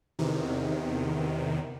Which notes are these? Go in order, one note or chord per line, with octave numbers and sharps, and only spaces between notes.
E2 C3 D#3